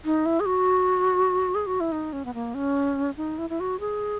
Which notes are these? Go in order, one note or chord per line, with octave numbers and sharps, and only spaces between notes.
D#4
E4
G#4
F#4
G#4
F#4
E4
D#4
C#4
B3
A#3
C#4
D#4
E4
E4
F#4
G#4